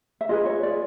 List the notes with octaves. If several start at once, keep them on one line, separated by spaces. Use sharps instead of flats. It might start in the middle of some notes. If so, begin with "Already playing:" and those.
E5
F4 G#4 B4 D#5
C#5
D5